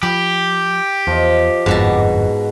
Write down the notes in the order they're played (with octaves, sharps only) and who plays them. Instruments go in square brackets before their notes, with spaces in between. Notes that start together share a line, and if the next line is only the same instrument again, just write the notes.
[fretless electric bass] F3 [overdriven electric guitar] G4 [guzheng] B5
[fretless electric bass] E2 [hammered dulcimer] F3 D#5
[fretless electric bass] G1 F2 [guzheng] G#2 F#4 A5 [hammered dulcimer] B2